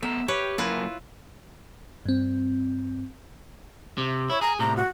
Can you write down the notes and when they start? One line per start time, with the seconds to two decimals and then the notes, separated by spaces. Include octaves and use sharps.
0.03 A3 B3 E5 A#5
0.28 G4 B4 C#5
0.58 F#2 A#3 E4 F4 B4
2.06 G2 C4
3.98 C3
4.30 E4 C#5
4.41 G#4 A#5
4.59 A2 C3 A#5
4.77 F#4